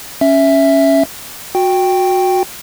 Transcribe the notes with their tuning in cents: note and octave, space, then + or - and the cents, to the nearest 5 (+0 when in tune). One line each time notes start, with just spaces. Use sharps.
C#4 +0 E5 +0
F#4 -20 G5 +0